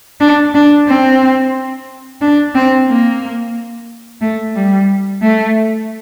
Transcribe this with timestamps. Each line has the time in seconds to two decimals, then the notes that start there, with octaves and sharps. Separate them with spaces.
0.21 D4
0.54 D4
0.88 C4
2.21 D4
2.55 C4
2.88 A#3
4.21 A3
4.55 G3
5.22 A3